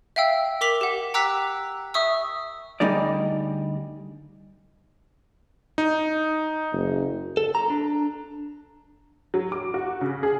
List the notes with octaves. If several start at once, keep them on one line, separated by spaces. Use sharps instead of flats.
E5 F5 G5 E6
A#4 D6 B6 F7 F#7
G4 F#5
G5 A#5 D6 E6 F#6 B6
E5 C#6 D#6 E6
D2 G3 D#4 G#4 D5
D#4
F#1
A4
A#5
D4
F#3
D6
F#4
C#3
G#4